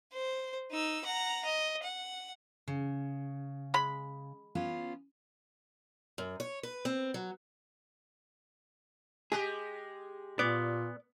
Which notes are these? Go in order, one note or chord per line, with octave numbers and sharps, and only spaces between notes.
C5
D#4 E6
F#5 A#5
D#5
F#5
C#3
G#3 B5
B3 C#4 F4
F#2
C#5
B4
C4
F#3
G#3 G4 G#4
A#2 B3 D5